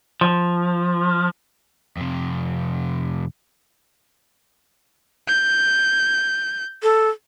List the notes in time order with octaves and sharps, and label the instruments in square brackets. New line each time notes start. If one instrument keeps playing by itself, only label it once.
[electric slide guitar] F3
[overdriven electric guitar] F2 C3
[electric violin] G6
[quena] A4